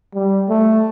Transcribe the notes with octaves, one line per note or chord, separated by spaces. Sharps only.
G3
A3